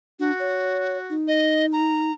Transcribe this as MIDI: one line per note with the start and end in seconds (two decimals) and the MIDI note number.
0.19 0.31 62
0.19 1.14 66
0.39 0.98 73
1.10 2.11 63
1.28 1.66 75
1.73 2.13 82